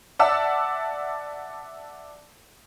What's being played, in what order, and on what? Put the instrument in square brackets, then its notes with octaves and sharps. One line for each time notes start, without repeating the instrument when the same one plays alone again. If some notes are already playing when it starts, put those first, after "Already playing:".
[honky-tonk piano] D5 E5 F#5 A5 E6